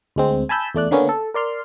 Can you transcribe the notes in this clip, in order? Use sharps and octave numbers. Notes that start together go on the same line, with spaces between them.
D2 G#3 C4
G#5 A5 B5 E6 G6
E2 A3 D5 F#6
D3 A#3 B3 C#4
A4
A#4 D5 C6 F6